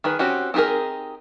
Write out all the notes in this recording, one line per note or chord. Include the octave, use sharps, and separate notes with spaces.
D#3 G#4 B4
C4 C#4 F#4 G4
C4 D#4 G4 G#4 A#4